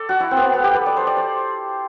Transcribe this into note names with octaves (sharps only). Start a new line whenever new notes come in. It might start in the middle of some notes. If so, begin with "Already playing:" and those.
Already playing: A4 D5
F#4
E4
C4
B3
C4
B3
G4
B4
D5
C5
D5
C5